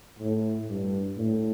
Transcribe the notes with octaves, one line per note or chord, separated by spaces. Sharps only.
A2
G2
A2